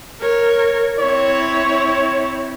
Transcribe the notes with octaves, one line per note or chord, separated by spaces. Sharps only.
A#4 C#5
C4 E4 C#5